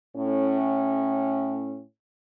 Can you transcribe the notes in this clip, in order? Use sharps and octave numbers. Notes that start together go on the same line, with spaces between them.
A2 C#4